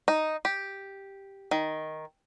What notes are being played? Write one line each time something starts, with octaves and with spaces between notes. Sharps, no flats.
D#4
G4
D#3